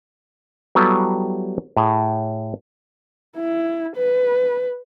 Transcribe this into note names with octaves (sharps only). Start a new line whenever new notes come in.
F#3 G3 B3 E4 G4 A4
A2 G#4
E4
B4